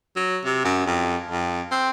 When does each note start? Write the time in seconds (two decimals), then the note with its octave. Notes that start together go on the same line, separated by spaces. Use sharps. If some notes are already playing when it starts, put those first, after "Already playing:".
0.16 F#3
0.45 C3
0.65 F#2
0.87 F2
1.31 F2
1.71 C4